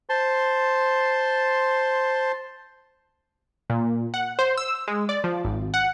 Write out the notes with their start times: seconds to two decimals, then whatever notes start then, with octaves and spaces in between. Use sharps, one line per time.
0.09 C5 A5 C6
3.70 A#2
4.14 F#5
4.39 C5
4.57 E6
4.88 G#3
5.09 D5
5.24 F3
5.45 G#1
5.74 F#5